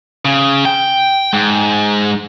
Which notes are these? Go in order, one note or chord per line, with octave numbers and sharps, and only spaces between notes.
C#3
G5
G#2